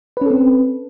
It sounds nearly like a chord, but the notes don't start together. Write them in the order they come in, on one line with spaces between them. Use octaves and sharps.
B4 C#4 A4 C4